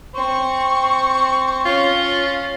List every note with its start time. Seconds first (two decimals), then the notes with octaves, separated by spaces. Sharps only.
0.14 C4 C#6
1.65 C#4 F4